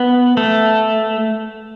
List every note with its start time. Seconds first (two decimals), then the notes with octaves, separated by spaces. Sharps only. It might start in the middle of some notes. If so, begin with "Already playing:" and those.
Already playing: B3
0.37 A3